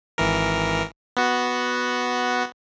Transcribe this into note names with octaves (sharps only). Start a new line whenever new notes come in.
G#1 E3 A#4
B3 F#4